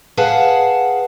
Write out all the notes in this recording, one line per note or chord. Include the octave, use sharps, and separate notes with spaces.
G#4 B4 F5 F#5 A5